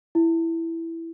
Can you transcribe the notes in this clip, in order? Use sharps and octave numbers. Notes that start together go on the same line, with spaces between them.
E4